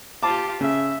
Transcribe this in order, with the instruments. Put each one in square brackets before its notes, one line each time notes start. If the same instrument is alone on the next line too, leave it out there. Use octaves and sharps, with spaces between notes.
[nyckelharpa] F4 G4 [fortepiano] A5 D6
[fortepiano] C#3 [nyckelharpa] E5